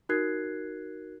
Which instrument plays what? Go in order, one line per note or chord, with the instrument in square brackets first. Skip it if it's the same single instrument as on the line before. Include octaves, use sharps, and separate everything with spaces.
[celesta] D#4 F#4 A#4 F#6 G#6 C7